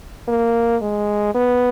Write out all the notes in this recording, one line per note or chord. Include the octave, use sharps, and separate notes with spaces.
A#3
G#3
B3